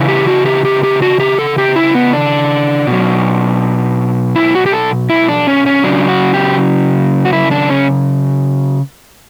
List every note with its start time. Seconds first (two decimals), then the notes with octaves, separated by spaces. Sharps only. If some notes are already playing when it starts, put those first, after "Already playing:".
Already playing: C#3 E3
0.08 G4
0.27 F#4
0.46 G4
0.65 G4
0.83 G4
1.02 F#4
1.20 G4
1.39 A4
1.58 G4
1.76 E4
1.95 B3
2.13 D4
2.87 B2
2.92 F#3
4.36 E4
4.55 F#4
4.66 G4
4.73 A4
5.10 E4
5.29 D4
5.47 C#4
5.66 C#4
5.84 C#3 F#3 D4
6.09 F#4
6.34 G4
7.25 F#4
7.33 E4
7.51 D4
7.70 C#4